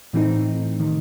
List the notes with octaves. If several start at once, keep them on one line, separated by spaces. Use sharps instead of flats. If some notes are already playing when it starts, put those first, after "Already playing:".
A2 E3 A3 C4 D#4
C3 D#3